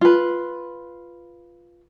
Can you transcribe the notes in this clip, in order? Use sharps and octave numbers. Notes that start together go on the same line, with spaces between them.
F4 B4